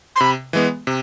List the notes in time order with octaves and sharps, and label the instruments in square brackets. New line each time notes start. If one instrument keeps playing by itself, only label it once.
[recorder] C6
[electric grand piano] C3 [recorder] B5
[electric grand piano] E3 G#3 B3
C3